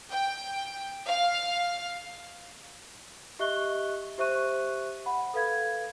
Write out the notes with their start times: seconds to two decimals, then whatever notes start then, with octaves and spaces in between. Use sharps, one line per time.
0.11 G5
1.07 F5
3.39 G4 D#5 E5 C#6 F#6 G7
4.18 G4 C5 E5 C#6 F#6 D#7
5.06 F#5 B5
5.34 A4 B4 F5 G#6